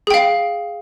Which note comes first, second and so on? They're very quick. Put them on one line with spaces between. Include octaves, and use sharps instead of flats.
G#4 G5 F5